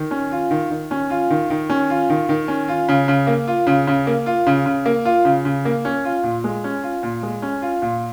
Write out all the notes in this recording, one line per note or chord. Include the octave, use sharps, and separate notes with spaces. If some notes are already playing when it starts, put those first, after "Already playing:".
Already playing: D#3
C#4
F4
D#3
D#3
C#4
F4
D#3
D#3
C#4
F4
D#3
D#3
C#4
F4
C#3
C#3
A#3
F4
C#3
C#3
A#3
F4
C#3
C#3
A#3
F4
C#3
C#3
A#3
C#4
F4
A#2
G#3
C#4
F4
A#2
G#3
C#4
F4
A#2